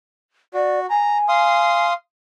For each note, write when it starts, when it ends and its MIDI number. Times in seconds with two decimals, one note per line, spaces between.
0.54 0.86 66
0.54 0.80 74
0.90 1.86 80
0.90 1.18 82
1.29 1.93 77
1.29 1.93 84
1.29 1.93 87